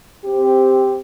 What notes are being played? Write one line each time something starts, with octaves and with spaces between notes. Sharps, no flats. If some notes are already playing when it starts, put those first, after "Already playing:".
C4 G4